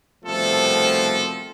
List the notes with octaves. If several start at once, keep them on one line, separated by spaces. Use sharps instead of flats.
C2 B2 F3 A3 C4 A4